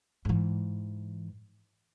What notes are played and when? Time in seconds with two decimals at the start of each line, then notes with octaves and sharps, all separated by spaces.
0.25 G#2 E3